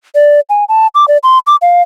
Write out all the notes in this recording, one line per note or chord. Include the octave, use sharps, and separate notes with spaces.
D5
G#5
A5
D6
D5
C6
D6
F5